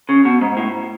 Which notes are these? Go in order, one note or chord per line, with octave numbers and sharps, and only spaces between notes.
C#3
B2
G#2
A2